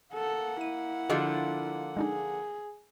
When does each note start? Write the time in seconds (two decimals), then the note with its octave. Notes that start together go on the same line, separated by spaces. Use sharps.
0.13 A#3 A4 F#5
0.61 E4 D#7
1.10 D3 F3 F4 F#4 G#4 D#5
1.97 G#3 D4 D#4 G#4